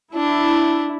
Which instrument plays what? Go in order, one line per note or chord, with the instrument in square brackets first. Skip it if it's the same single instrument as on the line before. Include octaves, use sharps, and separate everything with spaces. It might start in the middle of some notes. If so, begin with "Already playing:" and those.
[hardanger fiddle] D4 [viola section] E4